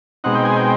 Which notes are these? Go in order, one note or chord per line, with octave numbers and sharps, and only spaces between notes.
B2 G#3 C4 D#4 F#5
G5
G#5
G5